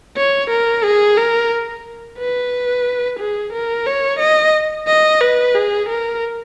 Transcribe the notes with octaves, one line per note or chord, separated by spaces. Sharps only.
C#5
A#4
G#4
A#4
B4
G#4
A#4
C#5
D#5
D#5
B4
G#4
A#4